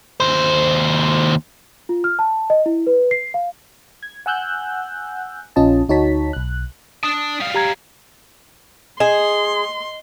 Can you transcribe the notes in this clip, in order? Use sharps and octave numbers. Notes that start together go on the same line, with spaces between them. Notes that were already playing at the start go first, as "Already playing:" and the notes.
D#2 C5
F4
F6
A5
D#5
E4
B4
C7
F5
G#6
F#5 G#5 E6 F#6 G6
A#1 C#4 F4 D#5 A5
D2 D#4 F#4 C#5 A5 B6
B1 F#6
D4 A5 D#6
G3 F5
G4 A#5 G#6
G#4 D#5 C6